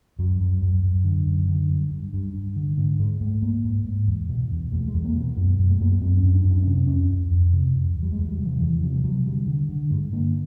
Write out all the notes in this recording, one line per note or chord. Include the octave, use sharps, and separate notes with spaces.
F#2 F#3
F#2
F#2
F#2
D3
F#2
D3
G2
G2
G2
G2
D3
G#2 D3
G#2 G#3
G#2 A3
G#2 A#3
G#2
G#2
E2
B2
E2
E2 A3
G#3
E2
A#3
B2
B3
F#2
F#2
A3
F#2 A#3
B3
F#2 C4
C#4
F#2
D4
F#2
D4
C3 C#4
C4
F2 C#4
F2
F2
C3
F2
E2
G3
G#3
E2
G3
C3
F3
E2 E3
C3 F3
G3
C3 F#3
D3 G3
D3
D3
G2 G#3
D3 A#3